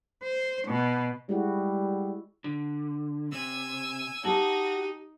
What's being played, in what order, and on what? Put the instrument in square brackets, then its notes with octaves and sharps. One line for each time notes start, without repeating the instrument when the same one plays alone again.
[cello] C5
B2
[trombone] G3 [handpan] G#3 E4 F#4
[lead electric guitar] D3
[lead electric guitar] C3 [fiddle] G#5 E6
[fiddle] D#4 [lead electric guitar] F#4 [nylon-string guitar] G4 A5